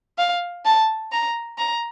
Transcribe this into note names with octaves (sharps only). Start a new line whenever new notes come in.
F5
A5
A#5
A#5